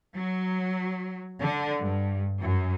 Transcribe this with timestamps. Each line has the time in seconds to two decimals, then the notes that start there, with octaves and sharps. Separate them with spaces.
0.16 F#3
1.41 D3
1.85 G2
2.42 F#2